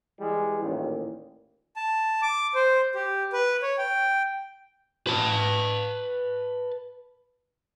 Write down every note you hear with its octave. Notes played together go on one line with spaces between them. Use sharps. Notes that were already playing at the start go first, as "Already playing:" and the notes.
E3 G3 G#3
A1 D#2 A#2
A5
D6
C5
G4
B4
C#5
G5
B4 A5